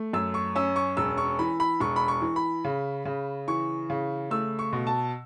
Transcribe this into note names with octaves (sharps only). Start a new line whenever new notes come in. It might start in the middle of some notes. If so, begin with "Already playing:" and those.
Already playing: A3
F#2 E6
C#6
C#4 E6
C#6
E1 E6
C#6
E3 B5
B5
E1 C#6
B5
C#6
E3
B5
C#3
C#3
E3 C#6
C#3
A3 E6
C#6
B2
A5